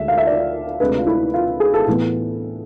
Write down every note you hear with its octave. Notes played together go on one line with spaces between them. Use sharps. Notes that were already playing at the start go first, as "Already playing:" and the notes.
Already playing: D2 D3 G#3 D4 E5
F5
E5
D5
D2 C3 G#3 D4 B4
F4
E4
F4
G#4
A4
A2 E3 B3